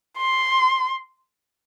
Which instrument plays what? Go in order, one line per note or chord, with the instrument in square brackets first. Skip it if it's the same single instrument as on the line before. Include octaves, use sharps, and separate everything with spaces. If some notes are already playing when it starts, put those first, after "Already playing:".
[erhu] C6